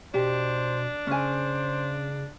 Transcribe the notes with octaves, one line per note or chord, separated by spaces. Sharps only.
B2 D4 G4 C5
C#3 C#4 C5 G#5